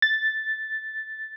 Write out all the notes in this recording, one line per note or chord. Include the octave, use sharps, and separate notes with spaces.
A6